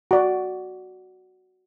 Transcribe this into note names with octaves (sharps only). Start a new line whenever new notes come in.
F#4 D5